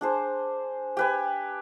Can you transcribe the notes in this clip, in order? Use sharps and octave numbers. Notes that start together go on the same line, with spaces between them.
D4 G#4 C5
G4 B4 G#5